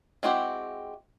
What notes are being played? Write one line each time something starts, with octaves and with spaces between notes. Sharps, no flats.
G#3 C4 E4 F#4 G4